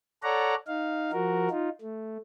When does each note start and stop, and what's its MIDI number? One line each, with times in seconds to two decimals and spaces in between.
0.23 0.55 69
0.23 0.55 73
0.23 0.55 74
0.23 0.55 78
0.23 0.55 82
0.68 1.11 63
0.68 1.11 77
1.12 1.48 53
1.12 1.48 66
1.12 1.48 70
1.51 1.69 63
1.51 1.69 65
1.82 2.18 57